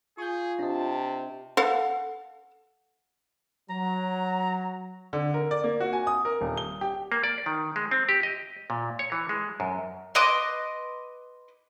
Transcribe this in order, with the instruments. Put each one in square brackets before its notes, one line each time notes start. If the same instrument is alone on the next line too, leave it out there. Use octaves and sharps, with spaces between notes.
[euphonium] F4 [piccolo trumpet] G#4 [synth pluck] C#6 G6
[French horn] C3 [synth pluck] D4 D#5 [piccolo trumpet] A5
[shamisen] A4 F5 F#5
[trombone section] F#3 [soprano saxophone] A#5
[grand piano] D3
A#4
D5
A#3
F#4
G#5
D#6
A#4
D#1
G7
G4
[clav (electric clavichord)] A#3
D5
D#3
G#3
C4
G4
D#5
A#2
C#5
E3
G#3
F#2
[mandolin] B4 D#5 C6 D6